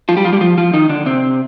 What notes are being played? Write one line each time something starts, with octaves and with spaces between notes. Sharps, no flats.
F3 F4
G3 G4
F3 F4
G3 G4
F3 F4
F3 F4
D#3 D#4
D3 D4
C3 C4